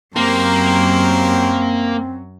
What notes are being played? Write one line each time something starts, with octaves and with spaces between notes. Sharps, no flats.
F#2 F#3 A#3 C4 G4 A#4 C5